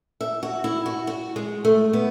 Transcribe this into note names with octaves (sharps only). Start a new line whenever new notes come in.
E5
F#4
E4
F#4
F#4
G#3
A3
B3